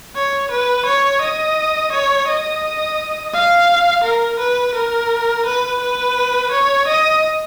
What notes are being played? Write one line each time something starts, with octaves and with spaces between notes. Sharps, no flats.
C#5
B4
C#5
D#5
C#5
D#5
F5
A#4
B4
A#4
B4
B4
C#5
D#5